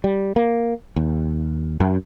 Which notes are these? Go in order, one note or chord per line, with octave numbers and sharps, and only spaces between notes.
G3
A#3
D#2
F#2